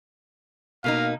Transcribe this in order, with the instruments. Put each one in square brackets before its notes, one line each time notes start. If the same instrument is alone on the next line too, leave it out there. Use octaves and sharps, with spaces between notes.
[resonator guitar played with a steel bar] B2 A#3 D#4 [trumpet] F5